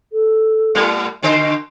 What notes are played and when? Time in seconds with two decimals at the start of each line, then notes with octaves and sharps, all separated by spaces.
0.13 A4
0.75 A2 G3 B3
1.22 B2 D3 C5 D#5